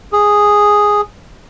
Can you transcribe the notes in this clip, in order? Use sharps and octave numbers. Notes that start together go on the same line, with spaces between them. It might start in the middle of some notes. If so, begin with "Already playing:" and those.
G#4